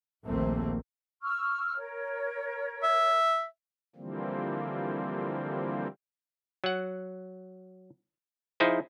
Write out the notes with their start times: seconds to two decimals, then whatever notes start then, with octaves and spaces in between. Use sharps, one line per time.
0.24 A#1 D#2 A3 A#3 C4
1.22 C#6 E6 F6
1.77 A#4 C#5
2.83 E5
3.96 D3 E3 F3 G3 A#3 C4
6.64 F#3 F#5
8.60 F3 D#4 E4 G#4 C5